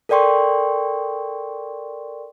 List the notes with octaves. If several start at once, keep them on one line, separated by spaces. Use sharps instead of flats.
A4 A#4 D5 G5 C6 C#6